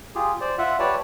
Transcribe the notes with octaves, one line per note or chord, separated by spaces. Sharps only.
F4 G4 G#4
C5 D5
F4 E5 F#5
G4 B4 C#5 D5 A5